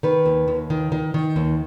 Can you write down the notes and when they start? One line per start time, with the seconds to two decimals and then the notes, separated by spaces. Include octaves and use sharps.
0.03 D#3 B4
0.26 D#2
0.48 D#2
0.70 D#3
0.92 D#3
1.14 D#3
1.36 D#2